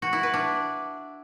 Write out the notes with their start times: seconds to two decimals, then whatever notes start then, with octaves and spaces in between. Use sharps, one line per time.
0.02 F#4
0.13 E4
0.23 B4
0.34 D4